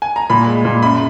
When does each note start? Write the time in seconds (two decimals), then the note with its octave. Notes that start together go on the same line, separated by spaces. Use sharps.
0.02 G#5
0.16 A#5
0.30 A#2 B5
0.47 G#3
0.65 A#2
0.83 F#2 B5